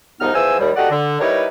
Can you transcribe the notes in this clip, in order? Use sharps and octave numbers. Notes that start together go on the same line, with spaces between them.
C2 G#2 F3 B3 D#4 F6
E2 E3 F3 C5 G#5 E6
D#2 G3
F#4 G4 A4 D5 D#5 F#5
D3
G3 D#4 E4 A#4 B4 C#5